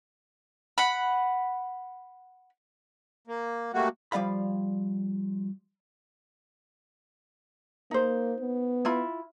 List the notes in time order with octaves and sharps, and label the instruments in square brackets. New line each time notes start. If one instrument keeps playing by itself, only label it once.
[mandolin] F#5 B5
[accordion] A#3
G3 A3 A#3 F#4
[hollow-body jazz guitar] F3 G3 D5 F5 B5
[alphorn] A#3 [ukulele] D#4 C5
[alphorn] B3
[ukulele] E4 F4 B5